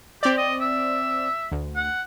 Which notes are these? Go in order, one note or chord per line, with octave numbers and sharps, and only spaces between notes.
C4 G4 D5
D#5
E5
D2
F#5